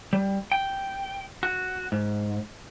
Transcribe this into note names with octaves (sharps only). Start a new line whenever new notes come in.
G3
G5
F#4
G#2